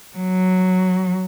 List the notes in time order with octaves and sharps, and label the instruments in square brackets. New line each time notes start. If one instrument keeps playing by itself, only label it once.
[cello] F#3